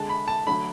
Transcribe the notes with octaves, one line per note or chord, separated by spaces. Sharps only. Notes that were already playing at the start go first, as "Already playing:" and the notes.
Already playing: D3 G#3 A5
B5
A5
D3 F#3 A3 B5